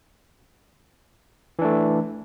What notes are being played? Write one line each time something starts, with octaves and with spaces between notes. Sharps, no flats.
E3 A3 D4